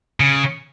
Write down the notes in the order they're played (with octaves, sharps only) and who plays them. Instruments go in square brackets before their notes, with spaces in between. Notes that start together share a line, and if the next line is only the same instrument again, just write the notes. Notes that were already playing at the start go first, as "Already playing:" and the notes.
[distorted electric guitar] C#3